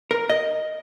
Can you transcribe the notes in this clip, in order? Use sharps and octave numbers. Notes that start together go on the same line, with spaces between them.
A#4
D#5